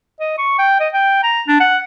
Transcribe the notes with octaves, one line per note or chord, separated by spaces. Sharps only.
D#5
C#6
G5
D#5
G5
A#5
D4
F#5